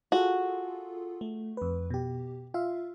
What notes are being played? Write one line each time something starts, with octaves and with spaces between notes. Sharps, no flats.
F4 F#4 G#4 A4
A3
F2 B4
B2 G4
F4 E5 F5